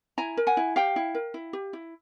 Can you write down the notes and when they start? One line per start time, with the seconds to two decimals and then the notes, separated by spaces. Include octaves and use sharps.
0.18 E4 G#5 A#5
0.37 A#4
0.47 F#5 G#5
0.57 E4
0.76 G4 F5 G5
0.96 E4
1.15 A#4
1.34 E4
1.53 G4
1.73 E4